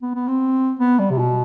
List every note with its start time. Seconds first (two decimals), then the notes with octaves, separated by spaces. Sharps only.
0.02 B3
0.15 B3
0.28 C4
0.79 B3
0.99 G3
1.10 C3
1.19 B2